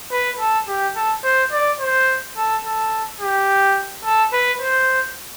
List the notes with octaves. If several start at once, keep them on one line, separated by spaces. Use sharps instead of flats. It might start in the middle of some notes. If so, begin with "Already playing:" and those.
B4
A4
G4
A4
C5
D5
C5
A4
A4
G4
A4
B4
C5